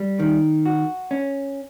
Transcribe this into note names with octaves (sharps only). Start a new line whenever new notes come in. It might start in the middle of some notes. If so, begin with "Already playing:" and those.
Already playing: G3
D#3
F#4
C#4